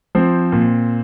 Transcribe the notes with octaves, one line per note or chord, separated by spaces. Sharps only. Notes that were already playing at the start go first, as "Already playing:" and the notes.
F3 C4
A#2